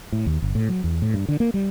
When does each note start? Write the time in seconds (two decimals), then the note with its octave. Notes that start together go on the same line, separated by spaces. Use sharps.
0.12 A2
0.26 D#2
0.42 G1
0.55 A2
0.69 F#3
0.84 E2
1.02 A2
1.14 G2
1.28 D3
1.40 A#3
1.54 G3